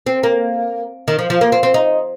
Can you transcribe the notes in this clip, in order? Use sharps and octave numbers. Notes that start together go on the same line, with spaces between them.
C4
A#3
D#3
F3
F3
A#3
C4
C4
D#4